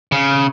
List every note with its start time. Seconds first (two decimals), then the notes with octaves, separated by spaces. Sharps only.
0.12 C#3